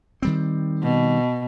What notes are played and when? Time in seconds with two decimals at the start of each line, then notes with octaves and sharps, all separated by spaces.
0.22 D#3 G3 C4
0.82 B2